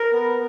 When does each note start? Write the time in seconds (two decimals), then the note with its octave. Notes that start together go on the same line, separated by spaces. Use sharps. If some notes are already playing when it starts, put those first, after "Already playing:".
Already playing: A#4
0.13 B3